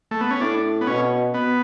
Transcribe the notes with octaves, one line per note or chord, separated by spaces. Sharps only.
A3
B3
C#4
A2 D4
B3
B2 C#4
B3